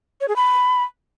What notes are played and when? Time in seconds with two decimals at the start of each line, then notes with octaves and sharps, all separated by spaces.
0.21 C#5
0.28 G#4
0.36 B5